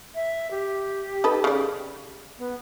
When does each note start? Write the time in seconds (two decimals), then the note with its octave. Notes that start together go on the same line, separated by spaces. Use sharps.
0.15 E5
0.51 G4
1.24 D#4 A4 B4
1.44 C#3 D5
2.38 B3